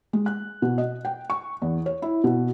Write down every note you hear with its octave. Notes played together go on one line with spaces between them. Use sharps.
G#3
F#6
B2
D#5
G5
C#6
E2
C#5
E4
B2